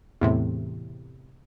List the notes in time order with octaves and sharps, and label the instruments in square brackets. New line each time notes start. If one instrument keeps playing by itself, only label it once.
[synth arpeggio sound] E2 A2 C3